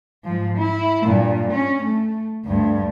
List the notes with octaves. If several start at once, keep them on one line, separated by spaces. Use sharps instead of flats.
G#2 F3
E4
G2 A#2
C#4
A3
D2 G2